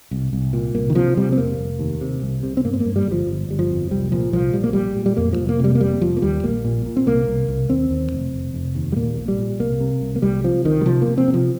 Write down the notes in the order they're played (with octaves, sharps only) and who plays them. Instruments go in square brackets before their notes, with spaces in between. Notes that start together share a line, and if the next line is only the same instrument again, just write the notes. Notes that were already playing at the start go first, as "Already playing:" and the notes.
[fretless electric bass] C2
C2
A#2
C2 A#3
D#3
C3 F3
C3 G3
C4
F1 A#3
F1
D#2
C3
C2
C3
C4
G2 A#3
C4
A#3
G2
G3
G1
F3
G1
G1 G3
F3
F2
C2 G3
A#2 F3
C2 F3
A#1 G3
A#3
A#2 G3
A#2
G3
F2 A#3
F3
F1
A#3
C3 G3
A#3
F1 G3
F1 F3
A#3
D#2 G3
A#1 A#3
A#2
A#2
C4
C2 A#3
C2
C2
D#2 C4
D#2
F1
F1
F1
D#2
G3
A#2 A#3
A#1
G3
A#2
C2 A#3
C3
C2
A#3
C2 G3
C3 F3
C2 D#3
G3
C3 F3
A#3
C3
C4
C3
F3